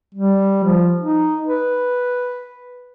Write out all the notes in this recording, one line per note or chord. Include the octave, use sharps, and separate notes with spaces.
G3
F3
D#4
B4